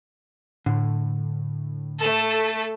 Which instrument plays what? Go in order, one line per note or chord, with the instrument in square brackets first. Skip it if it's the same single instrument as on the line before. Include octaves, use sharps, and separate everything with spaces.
[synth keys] A2 [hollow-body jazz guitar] D3
[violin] A3 A4